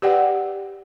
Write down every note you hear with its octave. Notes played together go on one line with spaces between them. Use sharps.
G4 B4 D5 F#5 G5